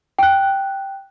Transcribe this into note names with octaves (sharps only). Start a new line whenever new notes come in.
G5 F#6